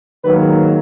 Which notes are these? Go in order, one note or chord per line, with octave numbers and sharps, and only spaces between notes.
G#2 D#3 F#3 A#3 B4